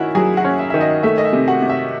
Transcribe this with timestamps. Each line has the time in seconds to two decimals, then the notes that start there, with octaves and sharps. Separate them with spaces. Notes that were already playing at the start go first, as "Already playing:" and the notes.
Already playing: D#3 C#4 E4 F#4 E5 F#5
0.15 F#3 G#4 G#5
0.37 F#4 F#5
0.44 C#4
0.59 E5
0.70 D#3 E5
0.81 D#5
1.03 A3 E5
1.18 D#5
1.25 E5
1.33 C3
1.48 F#4 F#5
1.62 C3
1.69 E5